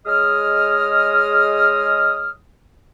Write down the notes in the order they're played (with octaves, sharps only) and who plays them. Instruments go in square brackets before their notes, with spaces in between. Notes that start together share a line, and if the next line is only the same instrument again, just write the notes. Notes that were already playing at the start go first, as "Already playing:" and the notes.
[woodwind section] G#3 G#4 C#5 D#5 D#6 F6